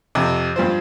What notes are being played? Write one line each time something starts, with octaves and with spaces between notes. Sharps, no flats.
F2 C3
G2 F3 C5